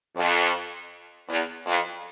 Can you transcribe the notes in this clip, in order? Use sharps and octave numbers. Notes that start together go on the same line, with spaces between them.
F2
E2
F2